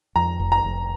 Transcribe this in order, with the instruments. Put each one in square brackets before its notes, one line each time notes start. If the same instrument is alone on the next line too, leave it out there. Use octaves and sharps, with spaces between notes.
[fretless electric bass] F2 [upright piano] A#5
[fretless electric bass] F1
[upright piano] A#5
[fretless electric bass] F1